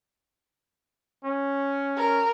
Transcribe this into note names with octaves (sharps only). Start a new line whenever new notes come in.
C#4
A#4